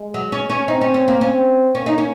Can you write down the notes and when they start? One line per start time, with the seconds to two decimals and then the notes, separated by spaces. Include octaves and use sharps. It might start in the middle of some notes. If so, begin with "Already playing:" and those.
Already playing: G#3
0.14 F#3
0.32 C#4
0.50 C#4
0.68 C4 D#4
0.81 C#4
0.94 C#4
1.08 A#3
1.21 C4 C#4
1.75 A#3 C#4
1.86 D#4
1.98 C#4